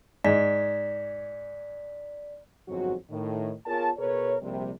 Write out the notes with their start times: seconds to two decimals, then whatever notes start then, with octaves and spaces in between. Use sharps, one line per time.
0.24 G#2 D5 B6
2.68 G1 F2 G#2 F#3 C4 F#4
3.10 A2 D#3
3.66 B3 F4 G#4 A#4 C#5 A5
3.97 B2 G#4 A#4 B4 C#5
4.41 A#1 C3 G3